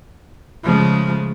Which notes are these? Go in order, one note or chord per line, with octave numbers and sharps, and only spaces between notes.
C#3 F3 G#3 A3